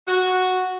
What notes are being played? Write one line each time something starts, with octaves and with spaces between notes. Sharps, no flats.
F#4